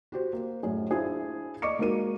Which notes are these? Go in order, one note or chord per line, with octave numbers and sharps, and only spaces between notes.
F#4 G4 C5
A#3 C5
F#2 A2 G#4
D4 E4 F4 G#4 C5
D5 D#5 C#6 D6 C#7
G#3 A#3 D#4 F#4 A#4 D#7